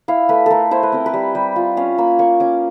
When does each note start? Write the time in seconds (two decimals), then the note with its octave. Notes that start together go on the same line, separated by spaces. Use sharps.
0.08 E4 F5
0.29 A3 B4
0.46 A3 A4 A#4
0.71 E4 C5
0.83 B4
0.92 C4 A#4
1.06 B4
1.14 G3
1.35 G3
1.56 F4
1.77 C#4 F5
1.98 A#3 B5
2.19 A#3 C#6
2.40 C#4 D6